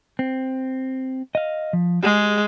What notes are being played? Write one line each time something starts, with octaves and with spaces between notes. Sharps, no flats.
C4
D#5 F5
F3
G#3 G4 G#4